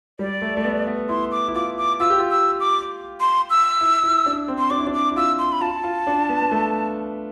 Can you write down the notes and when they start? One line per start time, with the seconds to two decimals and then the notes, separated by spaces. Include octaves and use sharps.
0.19 G3 D5
0.42 A3
0.57 A3
0.65 B3
0.87 B3
1.09 E4 C6
1.32 D6
1.48 E4
1.55 F4 D6
1.78 D6
2.00 F4 E6
2.10 G4
2.19 F4
2.30 E6
2.60 D6
3.20 C6
3.50 E6
3.81 E4
4.03 E4
4.26 D4
4.48 C4
4.59 C6
4.70 D4 D6
4.79 E4
4.87 D4
4.94 D6
5.12 E4
5.16 F4 E6
5.39 C6
5.52 B5
5.61 F4 A5
5.84 F4
6.07 D4
6.29 B3
6.42 B3
6.51 A3